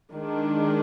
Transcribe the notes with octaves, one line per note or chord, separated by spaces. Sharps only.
D#3 G#3 D4